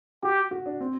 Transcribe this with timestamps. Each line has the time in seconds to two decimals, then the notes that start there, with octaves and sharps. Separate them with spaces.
0.23 F#4 G4
0.51 F#4
0.66 D4
0.81 C4